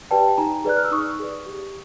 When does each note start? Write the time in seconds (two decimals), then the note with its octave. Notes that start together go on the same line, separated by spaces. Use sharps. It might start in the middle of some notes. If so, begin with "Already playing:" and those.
0.11 G4 B4 D5 G5 A5
0.38 D#4 G#5 A#5
0.65 G#4 B4 D5 F#6
0.77 F6
0.84 E6
0.92 D#4 C#6 D#6
1.20 G#4 B4 D5
1.46 G4